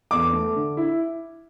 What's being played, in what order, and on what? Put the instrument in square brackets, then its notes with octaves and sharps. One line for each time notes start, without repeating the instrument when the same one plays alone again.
[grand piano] E2 [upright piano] D6
[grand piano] A3
D3
E4